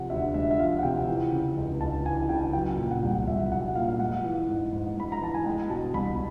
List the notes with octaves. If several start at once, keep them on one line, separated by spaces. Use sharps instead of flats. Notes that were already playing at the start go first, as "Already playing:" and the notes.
Already playing: C3 F3 F#5
D2 E5
G#3 E5
E5
F3 F5
F#5
C3 G5
E3
C#3
C#2
C#2 A5
E3 G#5
C#3 G5
F#3 G5
A#2
F#5
C2
C2 E5
F#3 F#5
A#2 F5
F5
G#3 F#5
E3
G#2
G#2
G#3 B5
A#5
E3 A5
G#5
G#3 G5
B2 A5
C2 B5